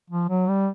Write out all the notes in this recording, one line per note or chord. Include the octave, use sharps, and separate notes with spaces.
F3
F#3
G3